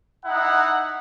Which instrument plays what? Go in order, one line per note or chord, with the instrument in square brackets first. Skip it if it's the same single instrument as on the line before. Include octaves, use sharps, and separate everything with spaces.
[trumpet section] D#4 E4 F#5